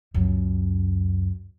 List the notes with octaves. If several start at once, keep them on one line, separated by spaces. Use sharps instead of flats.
C#2 F#2